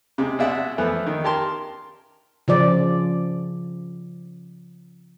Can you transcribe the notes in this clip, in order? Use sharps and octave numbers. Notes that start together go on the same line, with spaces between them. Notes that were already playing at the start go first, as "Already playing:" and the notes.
C3 G#3
B2 G#3 D5 E5 F#5
E3 F3 A3 B3
D#3
G4 A#4 A5 C6
C#3 F3 D5